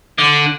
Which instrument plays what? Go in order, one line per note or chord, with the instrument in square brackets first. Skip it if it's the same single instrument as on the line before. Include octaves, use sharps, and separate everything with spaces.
[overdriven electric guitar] D3